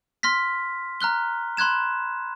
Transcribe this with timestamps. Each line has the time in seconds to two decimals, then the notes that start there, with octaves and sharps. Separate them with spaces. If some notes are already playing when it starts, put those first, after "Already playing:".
0.23 C6 F6 A#6 B6
1.01 A#5 F6 F#6 G7
1.57 B5 C6 F#6 G#6 E7